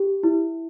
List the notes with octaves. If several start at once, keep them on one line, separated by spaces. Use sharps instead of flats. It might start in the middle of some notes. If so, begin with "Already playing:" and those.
Already playing: G4
E4